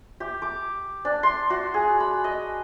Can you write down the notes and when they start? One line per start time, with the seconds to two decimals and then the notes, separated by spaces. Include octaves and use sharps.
0.20 G4
0.42 D6
1.05 D4
1.23 C6
1.50 F#4
1.74 G#4
2.00 B5
2.24 D#5